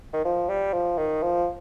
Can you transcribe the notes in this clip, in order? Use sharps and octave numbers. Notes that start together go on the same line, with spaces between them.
D#3
F3
G3
F3
D#3
F3